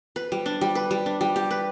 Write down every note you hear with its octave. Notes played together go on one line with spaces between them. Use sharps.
B4
G3
D4
G3
B4
G3
D4
G3
G4
B4